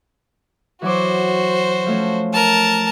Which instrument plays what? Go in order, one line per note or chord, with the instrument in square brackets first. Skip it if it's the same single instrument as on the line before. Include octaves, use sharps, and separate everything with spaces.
[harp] E3 F#3 D6 [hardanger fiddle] F#4 C5
[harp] F3 A3 C#4
[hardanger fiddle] A#4 A5